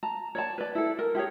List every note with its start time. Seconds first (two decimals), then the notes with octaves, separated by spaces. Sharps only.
0.03 A5 A#5
0.35 C#5 D5 A5
0.58 B4 D5
0.75 E4 A4
0.99 A#4
1.15 E4 G4 G#4 C#5